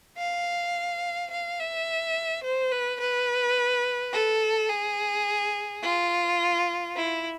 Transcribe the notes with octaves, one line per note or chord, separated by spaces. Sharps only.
F5
F5
E5
C5
B4
B4
A4
G#4
F4
E4